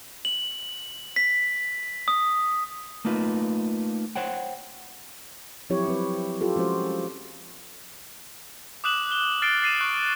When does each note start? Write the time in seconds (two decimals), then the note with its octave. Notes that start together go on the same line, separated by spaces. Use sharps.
0.25 F#7
1.16 B6
2.08 D#6
3.05 A3 A#3 D#4 F4 B4
4.16 C5 C#5 F#5 G5
5.70 F3 F#3 C4 E4 G4 C#5
5.85 G3 C4 B4
6.41 F4 G4 A4
6.56 F3 G#3 C#4 F#4 C5
8.84 D6 D#6 F#6 E7 F#7
9.12 G7
9.42 F6 A6 C7 D7 F#7 G7
9.62 A6 C7 D#7 E7
9.81 C#6 F#6